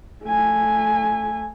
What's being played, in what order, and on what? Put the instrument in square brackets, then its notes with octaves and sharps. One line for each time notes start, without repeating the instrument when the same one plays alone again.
[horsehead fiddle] A3 G#5